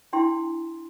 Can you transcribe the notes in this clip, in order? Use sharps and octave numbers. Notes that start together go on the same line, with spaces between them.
D4 E4 G5 C6